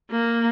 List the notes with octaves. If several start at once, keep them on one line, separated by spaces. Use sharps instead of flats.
A#3